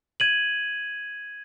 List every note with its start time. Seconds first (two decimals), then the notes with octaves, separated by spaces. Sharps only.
0.20 G#6 D#7 F#7